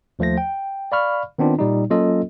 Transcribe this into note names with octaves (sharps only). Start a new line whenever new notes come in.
D#2 F3 A3 C5 A#6
G5
D5 F5 B5 C#6 F6
D#3 B3 C4 D4 F4
A#2 G3 D#4
F#3 A#3 C#4 F4 A4 D#5